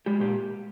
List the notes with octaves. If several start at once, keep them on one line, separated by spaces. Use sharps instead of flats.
G#3 G4
A#2 G4